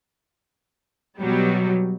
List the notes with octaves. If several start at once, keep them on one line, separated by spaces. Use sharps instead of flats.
B2 F#3 G3